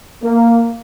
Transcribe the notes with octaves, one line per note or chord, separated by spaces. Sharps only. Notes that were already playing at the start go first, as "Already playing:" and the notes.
A#3